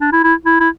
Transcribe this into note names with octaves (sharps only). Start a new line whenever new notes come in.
D4
E4
E4
E4
E4